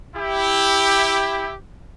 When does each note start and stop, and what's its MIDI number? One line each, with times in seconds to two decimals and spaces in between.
0.15 1.53 64
0.15 1.53 67